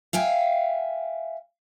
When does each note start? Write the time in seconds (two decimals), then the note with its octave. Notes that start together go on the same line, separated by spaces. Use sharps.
0.13 E5 F5 G5 G#5